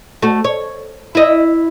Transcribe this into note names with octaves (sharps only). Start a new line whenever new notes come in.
A3 F#4
C#5
E4 D#5